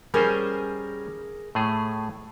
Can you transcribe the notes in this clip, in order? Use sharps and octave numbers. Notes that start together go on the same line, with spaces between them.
G3 C#4 G#4 A#4 C5 G#5
A2 A3 G#4